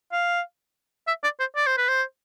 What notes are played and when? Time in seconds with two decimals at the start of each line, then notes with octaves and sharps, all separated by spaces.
0.12 F5
1.08 E5
1.24 D5
1.40 C5
1.56 D5
1.67 C5
1.77 B4
1.88 C5